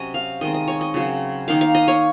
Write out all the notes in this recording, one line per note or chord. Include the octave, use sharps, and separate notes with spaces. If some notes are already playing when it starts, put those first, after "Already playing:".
Already playing: C3 F#3 C#4 D#5
F5
D#3 G#3 C4 D#5
D#5
C#5
D#5
C#3 F#3 C4
D#3 A#3 D#4 F5
F5
D#5
C#5